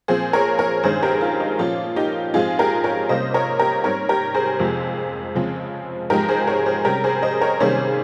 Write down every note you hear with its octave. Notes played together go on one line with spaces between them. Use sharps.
A#2 F3 C4 G#4 C5
A#4 C#5
A#4 C#5
G2 D#3 G#3 C#4 G#4 C5
G4 A#4
F4
D#4
A#2 F3 A#3 C#4 F4
D#4 G4
G#2 F3 G#3 C4 F4 G#4
G4 A#4
A#4 C#5
C3 G3 A#3 C#4 C5 D#5
A#4 C#5
G4 A#4
G#2 G3 C4 A#4 C#5
G4 A#4
G#4 C5
F2 C3 F3 G#3
C#3 F3 G#3 C4
G#2 F3 G#3 G4 A#4
G#4 C5
A#4 C#5
G#4 C5
C3 G3 C#4 G4 A#4
G#4 C5
C5 D#5
A#4 C#5
C3 D#3 G3 A#3 C#4 G#4 C5